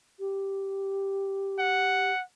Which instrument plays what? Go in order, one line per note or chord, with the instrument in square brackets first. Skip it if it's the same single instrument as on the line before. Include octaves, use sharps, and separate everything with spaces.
[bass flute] G4
[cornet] F#5